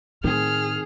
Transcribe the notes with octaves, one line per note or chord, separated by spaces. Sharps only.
A2 D#3 C4 G#4 F6